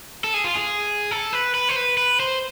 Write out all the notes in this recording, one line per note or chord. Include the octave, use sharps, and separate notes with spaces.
A4
G#4
F4
G#4
A4
B4
B4
C5
B4
B4
C5